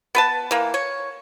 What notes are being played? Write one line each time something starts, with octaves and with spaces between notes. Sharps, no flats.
B3 B4 A5
E3 A#3
C#5